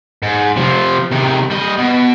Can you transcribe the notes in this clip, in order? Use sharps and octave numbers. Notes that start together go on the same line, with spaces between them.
G#2
C3 F3
C3 D#3
G3 D#5
B2